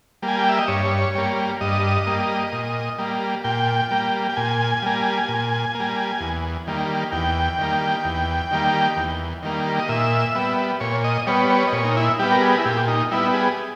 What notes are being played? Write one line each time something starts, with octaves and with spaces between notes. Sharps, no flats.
G3 A#3
G#5
G5
E5
D#5
G2 C#5
G3 A#3
G2 D#5
G3 A#3
A#2
G3 A#3
A#2 G5
G3 A#3
G5
A#2 G#5
G3 A#3
A#2
G3 A#3
E2
D#3 G3 A#3
E2 G5
D#3 G3 A#3
E2
D#3 G3 A#3
E2
D#3 G3 A#3
D#5
A#2 E5
G3 B3
A#2 C#5
D#5
G3 B3 C#5
C#5
D#5
A#2 C#5
D#4
E4
G3 B3 G4
A#4
G#4
E4
A#2 G4
D#4
G3 B3 E4
G#4